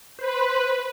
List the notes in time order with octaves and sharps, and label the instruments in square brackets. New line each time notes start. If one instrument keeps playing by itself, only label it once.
[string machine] B4 [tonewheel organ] C5